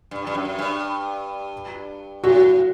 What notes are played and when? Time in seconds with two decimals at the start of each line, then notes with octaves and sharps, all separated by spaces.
0.11 G2
0.27 G2
0.35 F#2
0.59 G2
2.24 A2 F#4